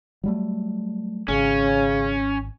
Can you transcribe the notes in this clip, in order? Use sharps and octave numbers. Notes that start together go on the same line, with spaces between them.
F#3 G3 A3
G#1 C#3 C#4